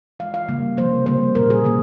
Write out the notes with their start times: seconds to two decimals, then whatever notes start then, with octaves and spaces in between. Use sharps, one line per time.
0.20 E3 G#3 F5
0.34 F5
0.49 C#3 G3 A#3
0.77 C3 F3 A#3 C5
1.06 C#3 G3 A#3 C5
1.35 A#2 G3 A#3 A#4
1.50 G#4
1.64 C3 E3 A#3